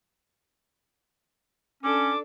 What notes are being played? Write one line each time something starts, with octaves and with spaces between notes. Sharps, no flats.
C#4 D4 A4 D6